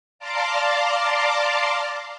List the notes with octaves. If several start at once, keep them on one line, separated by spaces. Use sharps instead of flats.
D5 F5 A5 A#5 C6 D6